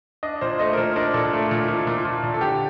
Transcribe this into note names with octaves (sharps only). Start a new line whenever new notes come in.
D4 D#5
A#2 C5
A3 D#5
A#4
A#2 C5
D4 A#4
A#2 A4
A3
A#2
A#2
A#2
A#2
A#2
A4
D3 G4